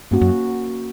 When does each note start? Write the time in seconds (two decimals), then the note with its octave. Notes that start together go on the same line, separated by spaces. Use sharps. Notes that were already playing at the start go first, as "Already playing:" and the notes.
0.11 G2 A#3 C#4 F#4
0.21 F#2